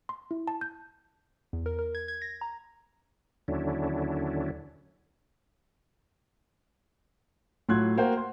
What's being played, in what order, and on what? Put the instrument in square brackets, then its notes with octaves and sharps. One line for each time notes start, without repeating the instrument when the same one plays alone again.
[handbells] C6
E4
A5
G6
[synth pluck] E2
A#4
A#4
G#6
G#6
A#6
A#5
[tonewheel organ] D#2 D3 F#3 C#4 D4 E4
[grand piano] A2 F#3 F4 C6 F#6 G#6
A#3 F#4 C5 F#5 G5
C6